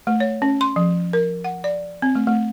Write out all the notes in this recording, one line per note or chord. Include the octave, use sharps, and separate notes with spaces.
A3
C#5
C#4
C6
F3
A#4
F#5
D5
C4
A3
A3